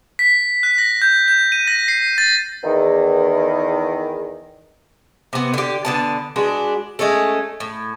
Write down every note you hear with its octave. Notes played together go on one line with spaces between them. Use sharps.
B6
F#6
A#6
G6
G6
D#7
A#6
C7
A6
E2 D#3
C3 B3
D3 G4
D3 B3 A5
G#3 D4 F#4 B4
G#3 A3 C#4 A4
A2